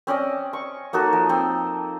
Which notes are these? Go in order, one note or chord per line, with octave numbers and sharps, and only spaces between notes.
C4 C#4 D5 D#5
C#6
A#3 D#4 F#4 A4
F3
C4